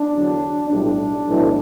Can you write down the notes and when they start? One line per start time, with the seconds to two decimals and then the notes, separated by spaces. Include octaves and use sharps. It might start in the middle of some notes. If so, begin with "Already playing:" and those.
Already playing: D4
0.14 E2 D3 F#3
0.70 B1 A2 G3 D4
1.27 B1 A2 E3